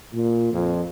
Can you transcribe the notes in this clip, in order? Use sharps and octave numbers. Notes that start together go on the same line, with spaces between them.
A#2
F2